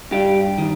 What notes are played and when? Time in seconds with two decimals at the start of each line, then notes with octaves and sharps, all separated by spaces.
0.11 G2 G4
0.58 D#3